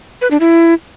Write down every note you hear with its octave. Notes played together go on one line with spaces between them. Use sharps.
B4
D4
E4